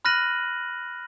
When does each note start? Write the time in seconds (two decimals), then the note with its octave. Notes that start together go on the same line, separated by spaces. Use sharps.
0.05 B5 F6 F#6 A#6 D#7 F#7